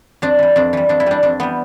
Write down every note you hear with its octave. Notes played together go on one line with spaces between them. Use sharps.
F2 D4
E3 G3
F2 D4
E3 G3
F2 D4
E4
E3 G3 D4
F2 D4
E3 G3 B3